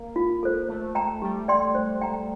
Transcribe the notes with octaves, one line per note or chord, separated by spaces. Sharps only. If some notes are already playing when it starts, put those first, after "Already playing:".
Already playing: A#3
F4
A4 C5
A3 C5
G5 A#5
G3 G4
D5 G5 C6
C5
G5 A#5